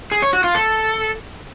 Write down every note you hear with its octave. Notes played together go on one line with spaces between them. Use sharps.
G#4
C#5
F#4
F4
A4